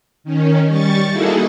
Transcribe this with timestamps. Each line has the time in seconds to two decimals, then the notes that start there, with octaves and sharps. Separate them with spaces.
0.24 D#3 C#4
0.67 G3 C#6 A6
1.10 A#3 D#4 E4 F#4 G#4 A4